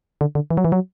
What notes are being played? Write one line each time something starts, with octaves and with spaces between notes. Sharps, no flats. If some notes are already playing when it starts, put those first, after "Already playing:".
D3
D3
E3
F#3
E3
F#3